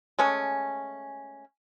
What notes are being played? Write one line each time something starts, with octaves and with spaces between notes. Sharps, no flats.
G#3 A3 C#4